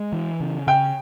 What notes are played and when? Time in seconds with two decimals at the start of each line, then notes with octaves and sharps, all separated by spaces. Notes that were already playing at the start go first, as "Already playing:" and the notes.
Already playing: G#3
0.13 E3
0.40 C#3
0.67 C#3 G5